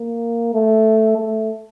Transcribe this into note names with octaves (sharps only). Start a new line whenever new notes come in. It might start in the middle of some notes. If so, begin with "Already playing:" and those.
Already playing: A#3
A3
A3